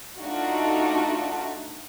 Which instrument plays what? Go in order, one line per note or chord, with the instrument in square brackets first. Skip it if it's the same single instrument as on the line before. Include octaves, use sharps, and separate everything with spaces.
[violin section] A3 D4 D#4 F4 F#4